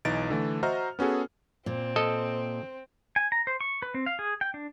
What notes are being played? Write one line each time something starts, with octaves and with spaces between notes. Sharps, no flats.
B1 E3 D#4 A6 D7
D3 E3 A3
F#4 C5 D#5 E5 A#5 F6
B3 C#4 F#4 G#4 A4
A#2 C4
A4 D#5
G#5
A#5
C5
C#6
B4
C4
F5
G#4
G5
D4